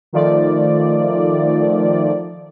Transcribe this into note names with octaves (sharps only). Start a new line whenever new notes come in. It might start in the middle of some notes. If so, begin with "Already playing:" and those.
D#3 F3 A3 D5